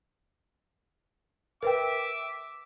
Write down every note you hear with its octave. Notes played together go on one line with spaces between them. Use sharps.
A#4 B4 E5 G5 D6